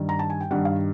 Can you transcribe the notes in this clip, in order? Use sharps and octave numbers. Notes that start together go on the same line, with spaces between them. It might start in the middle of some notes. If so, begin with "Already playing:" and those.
Already playing: G2 D#3 G3
A#5
A5
G#5
G5
G2 D#3 G3 F#5
F5